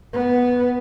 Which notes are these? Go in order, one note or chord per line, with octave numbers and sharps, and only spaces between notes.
B3